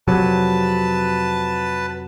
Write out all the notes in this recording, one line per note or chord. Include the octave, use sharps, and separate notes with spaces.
F2 C3 F#3 B4 A5